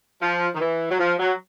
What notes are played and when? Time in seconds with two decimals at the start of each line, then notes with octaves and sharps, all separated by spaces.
0.21 F3
0.55 D#3
0.60 E3
0.90 F#3
0.99 F3
1.19 F#3